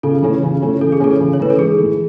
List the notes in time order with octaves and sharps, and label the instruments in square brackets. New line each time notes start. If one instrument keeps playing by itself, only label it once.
[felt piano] C#3 [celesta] A4
[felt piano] E3 A3 C#4
C#3
E3 A3 C#4
[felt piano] C#3 [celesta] A4
[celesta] G#4
[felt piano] E3 A3 C#4 [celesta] A4
[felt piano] C#3
[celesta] C#5
[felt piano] E3 A3 C#4 [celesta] B4
[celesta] A4
[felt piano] G#2 [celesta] G#4
[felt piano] E3 A3